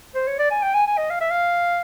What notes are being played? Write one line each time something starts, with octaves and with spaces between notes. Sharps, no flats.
C5
C#5
D5
G#5
G5
G#5
G#5
D#5
F5
E5
F5